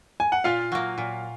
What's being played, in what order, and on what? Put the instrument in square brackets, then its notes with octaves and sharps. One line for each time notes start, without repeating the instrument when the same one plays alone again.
[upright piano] G#5
F#5
[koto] A#2 [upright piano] F4 F5
[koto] F#3 A#3
A#2